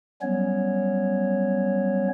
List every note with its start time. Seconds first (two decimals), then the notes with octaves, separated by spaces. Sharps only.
0.22 F#3 G3 B3 C#4 C#5